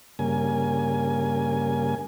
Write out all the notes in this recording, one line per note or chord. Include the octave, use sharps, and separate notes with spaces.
G2 C#3 A#3 G#5